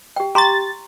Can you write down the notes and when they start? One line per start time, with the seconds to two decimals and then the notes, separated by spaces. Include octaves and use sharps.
0.16 G4 G5
0.35 G4 A#5 C6 C#6 A6